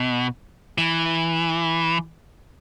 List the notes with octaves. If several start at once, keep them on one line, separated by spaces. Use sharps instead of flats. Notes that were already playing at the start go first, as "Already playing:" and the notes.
Already playing: B2
E3